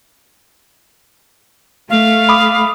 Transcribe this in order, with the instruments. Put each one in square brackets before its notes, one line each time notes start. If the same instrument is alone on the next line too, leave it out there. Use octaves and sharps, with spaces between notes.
[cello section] A3 [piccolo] F5
[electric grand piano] B5 D6 D#6